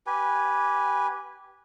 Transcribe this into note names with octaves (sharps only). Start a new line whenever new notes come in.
G4 B4 G#5